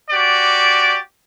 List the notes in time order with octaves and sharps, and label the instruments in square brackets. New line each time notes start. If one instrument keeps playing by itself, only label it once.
[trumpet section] F#4 G4 D5